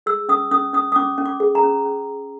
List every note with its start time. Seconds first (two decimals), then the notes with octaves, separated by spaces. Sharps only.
0.06 G#4 E6
0.29 C#4 D#6
0.51 C#4 D#6
0.73 C#4 D#6
0.92 D#6
0.96 C#4 D6
1.18 C#4
1.26 D6
1.40 G#4
1.55 A#5
1.63 C#4
1.85 C#4